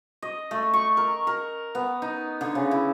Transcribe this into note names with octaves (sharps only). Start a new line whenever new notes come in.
D#5
A3
C#6
A#4
A#4
B3
D#4
D3
C#3
E4